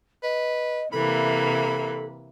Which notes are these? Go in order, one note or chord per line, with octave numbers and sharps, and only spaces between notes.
B4 D#5
C3 E3 A#3 A4 B5